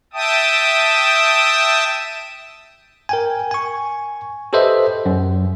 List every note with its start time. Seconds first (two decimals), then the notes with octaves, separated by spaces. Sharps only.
0.13 E5 G5 A5 D#6
3.09 A#4 G5 G#5
3.51 G#5 C#6
4.53 G4 A4 B4 C5 D#5 E5
5.06 F#2